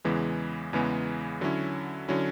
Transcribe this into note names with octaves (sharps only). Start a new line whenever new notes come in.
E2 C#3 E3 G#3 B3
E2 C#3 E3 G#3 B3
D3 F#3 C#4 E4
D3 F#3 C#4 E4